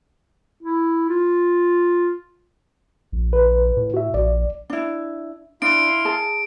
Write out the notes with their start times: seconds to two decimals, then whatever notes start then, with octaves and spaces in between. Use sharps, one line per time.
0.63 E4
1.09 F4
3.12 A#1
3.33 B4
3.77 A2
3.94 F#4 E5
4.14 A#1 D5
4.70 D4 E4
5.62 D4 E4 F5 C6 D7
6.05 G#4 A5